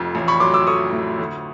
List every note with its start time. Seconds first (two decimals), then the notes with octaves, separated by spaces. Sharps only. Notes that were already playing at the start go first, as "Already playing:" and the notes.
Already playing: F1 F2
0.15 A1
0.28 B5 C#6
0.40 F#3 C6 D6
0.54 D6 E6
0.67 A3 C#6 D#6
0.92 A2
1.19 D2